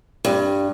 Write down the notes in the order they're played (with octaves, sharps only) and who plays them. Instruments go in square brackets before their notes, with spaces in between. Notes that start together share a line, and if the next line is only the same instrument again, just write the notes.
[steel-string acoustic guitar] G2